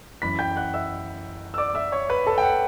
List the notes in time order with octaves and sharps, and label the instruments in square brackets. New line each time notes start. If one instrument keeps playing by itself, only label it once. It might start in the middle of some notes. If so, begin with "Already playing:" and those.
[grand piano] F#2 E3 B5 B6
G5 G6
F#5 F#6
E5 E6
E6
D5 D6
E5 E6
C#5 C#6
B4 B5
A4 A5
G5
F#5